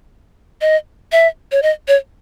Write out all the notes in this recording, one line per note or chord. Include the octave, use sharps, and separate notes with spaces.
D#5
E5
C#5
D#5
C#5